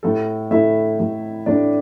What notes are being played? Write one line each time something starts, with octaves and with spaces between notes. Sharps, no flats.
A2 A3 A4
A2 A3 E4 E5
A2 A3
A2 A3 D4 D5